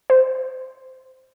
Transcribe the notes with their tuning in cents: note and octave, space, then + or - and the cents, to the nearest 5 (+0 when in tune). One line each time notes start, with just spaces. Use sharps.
C5 -5